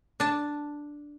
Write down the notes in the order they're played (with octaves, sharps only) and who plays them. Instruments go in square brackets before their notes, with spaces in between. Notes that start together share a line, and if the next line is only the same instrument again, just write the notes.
[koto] D4 A5